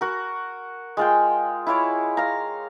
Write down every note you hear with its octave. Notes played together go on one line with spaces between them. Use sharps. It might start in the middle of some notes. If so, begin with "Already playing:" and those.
F#4 A#4
G#3 F4 G5
E4 F4 C#5 D6
F5 A#5